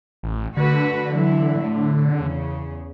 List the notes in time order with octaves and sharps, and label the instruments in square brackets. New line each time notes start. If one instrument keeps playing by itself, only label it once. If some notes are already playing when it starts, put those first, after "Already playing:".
[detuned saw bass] A1
[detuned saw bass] D3 [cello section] A3 F#4 B4
[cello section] E3 F#3 E4
A2
E2 C#3